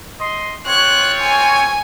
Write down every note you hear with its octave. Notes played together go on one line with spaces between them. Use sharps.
D#5 C6
C4 F4 C#5 F#6
G#5